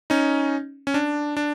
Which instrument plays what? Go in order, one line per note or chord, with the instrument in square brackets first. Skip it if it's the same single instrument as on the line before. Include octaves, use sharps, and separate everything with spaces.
[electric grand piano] C#4 D#4
C#4
D4
D4